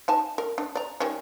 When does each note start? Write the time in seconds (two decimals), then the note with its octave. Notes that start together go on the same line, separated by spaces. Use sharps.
0.08 D#4 G#5 A5
0.38 A#4
0.58 D4
0.75 D5 A#5
1.00 D#3 G3 C#4